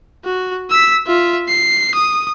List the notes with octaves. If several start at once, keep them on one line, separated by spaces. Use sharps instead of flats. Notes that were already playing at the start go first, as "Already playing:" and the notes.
F#4
E6 B6
F4 E5
C7
D#6